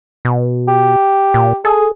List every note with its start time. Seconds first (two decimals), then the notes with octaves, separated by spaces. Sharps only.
0.25 B2
0.68 G4
1.34 A#2
1.65 G#4 A4